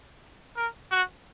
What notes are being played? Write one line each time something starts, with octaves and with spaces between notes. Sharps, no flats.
A#4
F#4